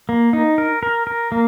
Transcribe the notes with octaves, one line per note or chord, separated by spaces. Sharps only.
A#3
D#4
A#4
A#4
A#4
A#3